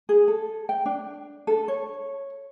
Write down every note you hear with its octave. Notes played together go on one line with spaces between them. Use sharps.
G#4
A4
G5
D4
A4
C#5